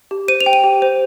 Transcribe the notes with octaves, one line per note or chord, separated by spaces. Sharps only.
G4
C5 D#7
F7
G5
D#7
G4
C5